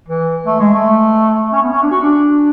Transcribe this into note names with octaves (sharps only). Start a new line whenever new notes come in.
E3
A3
G#3
A3
C#4
B3
C#4
D4
F#4
D4